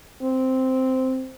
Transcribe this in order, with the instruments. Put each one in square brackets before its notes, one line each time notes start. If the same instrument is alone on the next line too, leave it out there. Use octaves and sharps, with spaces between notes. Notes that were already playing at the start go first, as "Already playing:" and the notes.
[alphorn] C4